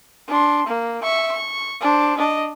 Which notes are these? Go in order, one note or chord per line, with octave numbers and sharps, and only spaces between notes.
D4 C6
A#3
E5 C#6
C#6
D4 C5
D4 D#5